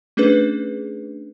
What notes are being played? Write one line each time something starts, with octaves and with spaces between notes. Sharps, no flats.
A3 C#4 D4 G#4 B4